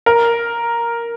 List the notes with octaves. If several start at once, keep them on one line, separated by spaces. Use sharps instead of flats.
A#4